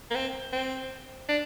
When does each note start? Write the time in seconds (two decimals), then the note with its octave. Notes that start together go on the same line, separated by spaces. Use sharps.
0.11 A#3
0.16 C4
0.53 C4
1.29 D4